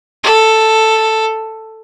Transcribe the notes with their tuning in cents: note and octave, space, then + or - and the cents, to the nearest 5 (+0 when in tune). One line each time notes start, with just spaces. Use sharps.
A4 +5